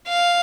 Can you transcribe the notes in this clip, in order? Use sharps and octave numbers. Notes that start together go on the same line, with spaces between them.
F5